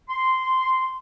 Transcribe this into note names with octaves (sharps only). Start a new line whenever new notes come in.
C6